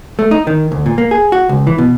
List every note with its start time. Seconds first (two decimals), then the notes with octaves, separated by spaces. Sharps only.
0.19 A3
0.31 D#4
0.47 D#3
0.72 D2
0.86 A#2
0.98 A#3
1.11 G#4
1.32 F#4
1.49 C#2
1.67 E3
1.78 B2